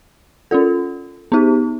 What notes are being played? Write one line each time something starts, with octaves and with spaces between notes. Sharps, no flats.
C#4 F4 A4
B3 D#4 G4